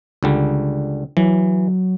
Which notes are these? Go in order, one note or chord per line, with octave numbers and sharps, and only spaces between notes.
C#2 D3 G3
E3 F#3